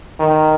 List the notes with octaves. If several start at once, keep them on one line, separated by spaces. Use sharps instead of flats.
D#3